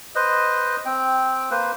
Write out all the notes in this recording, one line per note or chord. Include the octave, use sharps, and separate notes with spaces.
B4 C5 D#5
C4 G5
A#3 B4 C5